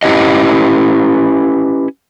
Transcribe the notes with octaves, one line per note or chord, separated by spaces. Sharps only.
C#4 E4 G4 B4 D#5